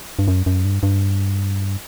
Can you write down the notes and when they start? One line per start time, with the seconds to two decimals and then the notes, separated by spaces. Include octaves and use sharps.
0.19 G2
0.28 F#2
0.46 F#2
0.65 G2
0.83 G2